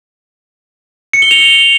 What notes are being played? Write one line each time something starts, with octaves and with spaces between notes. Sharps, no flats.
C#7
G7
F7